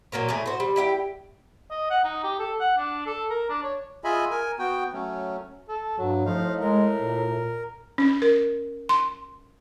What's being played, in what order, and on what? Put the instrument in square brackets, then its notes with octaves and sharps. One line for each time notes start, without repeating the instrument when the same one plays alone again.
[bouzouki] A#2 F#3 A#3 C#5
A2 A3 G#4 C#5
F#4 C5
G3
E4 G4 E5 G5
[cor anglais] D#5
F#5
D#4
G4
A4
F#5
D4
A4
A#4
D4
C#5
[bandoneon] F4 G#4 D#5 E5 G#5 B5
A#4 G#5
B3 F#4 G5
F#3 A3 C#4
[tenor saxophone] A4
[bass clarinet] G2 [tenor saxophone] F#3
[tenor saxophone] A2 [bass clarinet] F3 [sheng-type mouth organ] D#4 F5
[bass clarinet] G#3 [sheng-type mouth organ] A#4
[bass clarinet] A#2
[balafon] C#4
A#4
C6